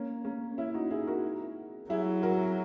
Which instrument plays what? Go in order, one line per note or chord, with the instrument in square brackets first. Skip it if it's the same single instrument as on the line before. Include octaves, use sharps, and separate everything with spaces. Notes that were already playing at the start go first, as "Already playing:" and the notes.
Already playing: [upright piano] A#3 C#4
A#3 C#4
C#4 E4
D#4 F#4
E4 G#4
F#4 A#4
[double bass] F#3 [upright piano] E4 G#4
[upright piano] F#4 A#4